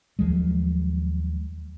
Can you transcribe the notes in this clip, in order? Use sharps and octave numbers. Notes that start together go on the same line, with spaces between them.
D#2 F3 F#3 G#3